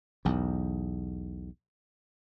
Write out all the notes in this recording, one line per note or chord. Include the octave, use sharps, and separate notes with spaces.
B1 E2